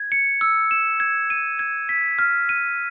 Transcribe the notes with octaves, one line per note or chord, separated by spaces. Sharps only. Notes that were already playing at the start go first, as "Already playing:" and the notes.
Already playing: G#6
C#7
E6
E7
G#6
D#7
G#6
B6
F6
D#7